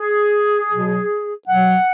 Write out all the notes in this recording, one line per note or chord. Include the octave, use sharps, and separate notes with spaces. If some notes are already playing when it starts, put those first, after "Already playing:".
Already playing: G#4
B2 F#3
B2 F#3 F#5